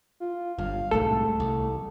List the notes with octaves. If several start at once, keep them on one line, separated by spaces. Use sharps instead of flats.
F4
G1 G2 F5
D1 C2 G#2 A3 A4
C2